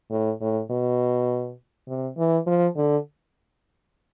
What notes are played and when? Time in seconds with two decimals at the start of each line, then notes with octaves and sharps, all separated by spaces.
0.11 A2
0.41 A2
0.70 B2
1.88 C3
2.17 E3
2.47 F3
2.76 D3